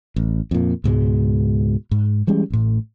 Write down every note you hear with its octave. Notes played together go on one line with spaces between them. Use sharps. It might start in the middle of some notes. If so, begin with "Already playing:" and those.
A1
F2 A#2
C#2 G#2 B2 G#3
G#2
E3 G3 G#3 C#4
A1 A2